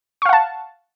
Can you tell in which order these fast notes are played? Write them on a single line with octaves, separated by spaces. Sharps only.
C#6 F5 F#5 A5